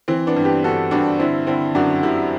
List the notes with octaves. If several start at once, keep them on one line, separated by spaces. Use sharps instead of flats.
E3 C4
B3 D4
G2
G4 B4
G2 F#4 A4
G2 D4 F#4
D3 C4 E4
D3 C4 E4
F#2 D4 F#4
D3 E4 G4